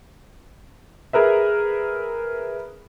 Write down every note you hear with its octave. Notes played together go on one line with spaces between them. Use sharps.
G#4 A#4 B4 E5